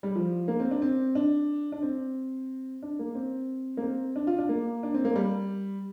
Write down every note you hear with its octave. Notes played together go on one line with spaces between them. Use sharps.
G3
F3
A#3
C4
D4
C4
D4
D4
C4
D4
A#3
C4
A#3
C4
D4
F4
D4
A#3
D4
C4
A#3
G3